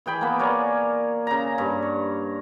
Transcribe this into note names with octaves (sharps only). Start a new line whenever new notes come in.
E3 G#4 G5 B5
A#3 B3
A#4 C#5 D5 G#5
C#3 A#5
G2
C#5